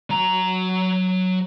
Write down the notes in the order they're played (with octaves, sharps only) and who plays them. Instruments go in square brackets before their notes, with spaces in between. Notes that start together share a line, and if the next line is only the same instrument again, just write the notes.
[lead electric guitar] F#3 A#5